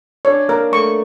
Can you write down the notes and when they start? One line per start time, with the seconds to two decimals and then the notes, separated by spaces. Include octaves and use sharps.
0.25 D4 C#5
0.48 A#3 A#4
0.72 A3 C#6